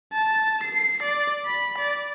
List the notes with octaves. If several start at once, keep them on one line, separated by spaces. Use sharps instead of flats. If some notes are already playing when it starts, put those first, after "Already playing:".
A5
C7
D5
B5
D5